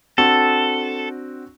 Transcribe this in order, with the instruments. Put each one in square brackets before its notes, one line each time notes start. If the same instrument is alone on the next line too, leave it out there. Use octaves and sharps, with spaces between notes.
[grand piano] C4 D4 F#4 [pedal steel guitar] A4